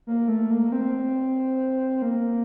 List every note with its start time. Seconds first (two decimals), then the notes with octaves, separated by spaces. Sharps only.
0.07 A#3
0.28 A3
0.50 A#3
0.72 C4
2.02 A#3